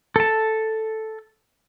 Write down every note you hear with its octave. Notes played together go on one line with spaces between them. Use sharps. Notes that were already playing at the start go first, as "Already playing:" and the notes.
A4 A5